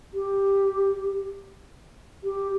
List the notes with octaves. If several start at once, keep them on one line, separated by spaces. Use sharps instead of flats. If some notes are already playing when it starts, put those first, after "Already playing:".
G4
G4